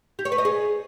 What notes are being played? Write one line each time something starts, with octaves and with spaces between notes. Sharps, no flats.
G4
C#5
B4
D#5
G#4